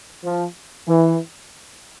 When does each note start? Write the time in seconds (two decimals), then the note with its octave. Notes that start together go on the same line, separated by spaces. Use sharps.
0.23 F3
0.86 E3